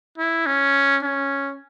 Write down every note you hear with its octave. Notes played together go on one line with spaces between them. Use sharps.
E4
C#4
C#4